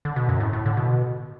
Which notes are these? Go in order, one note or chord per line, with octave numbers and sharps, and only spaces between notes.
D3
B2
F#2
A2
A2
D3
B2